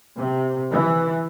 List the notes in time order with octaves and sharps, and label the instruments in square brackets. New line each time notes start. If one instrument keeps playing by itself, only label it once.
[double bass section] C3
E3